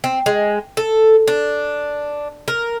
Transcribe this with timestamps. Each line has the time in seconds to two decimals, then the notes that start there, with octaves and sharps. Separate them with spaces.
0.04 C4
0.26 G#3
0.77 A4
1.28 D4
2.48 A#4